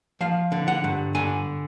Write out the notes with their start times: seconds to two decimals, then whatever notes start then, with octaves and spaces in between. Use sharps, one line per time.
0.21 F3 F5
0.52 D3
0.68 F#5
0.84 G2
1.15 D3 G#5